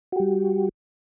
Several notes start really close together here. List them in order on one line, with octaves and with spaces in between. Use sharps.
F#4 G4 G3